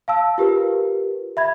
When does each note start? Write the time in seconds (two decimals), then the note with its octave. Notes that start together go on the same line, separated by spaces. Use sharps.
0.08 F5 A5 E6
0.38 F4 G4 A#4 B4
1.37 E5 B5 G#6